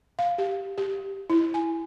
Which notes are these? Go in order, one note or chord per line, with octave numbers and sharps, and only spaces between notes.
F5
G4
G4
E4
G#5